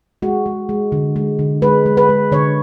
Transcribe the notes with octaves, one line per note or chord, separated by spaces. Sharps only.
G#3 F#4
G#3
G#3
D3
G#3
D3
G#3 B4
G#3
B4
G#3
D3 C#5